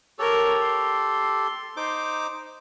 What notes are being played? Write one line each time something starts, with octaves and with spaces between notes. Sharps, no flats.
G4 A4 A#4 C#5
C6
D#4 C5 D6